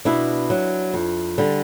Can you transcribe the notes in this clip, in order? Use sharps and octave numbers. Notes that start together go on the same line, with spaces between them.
B2 D4 E4
F#3
F2
D3 G3